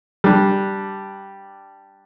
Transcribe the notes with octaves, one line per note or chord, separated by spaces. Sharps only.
G3 D4